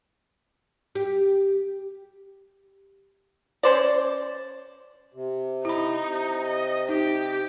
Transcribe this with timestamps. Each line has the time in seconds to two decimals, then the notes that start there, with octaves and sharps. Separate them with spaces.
0.95 G4
3.63 C#4 C5 D5
5.14 C3
5.65 D#4 E4 B5
6.04 C3
6.46 D#5
6.89 D#4 G4